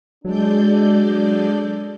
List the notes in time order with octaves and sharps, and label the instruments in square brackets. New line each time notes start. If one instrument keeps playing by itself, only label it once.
[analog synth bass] F#3 [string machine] G#3 D5 G6 [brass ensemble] D4 A4